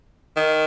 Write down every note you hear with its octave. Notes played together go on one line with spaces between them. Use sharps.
D#3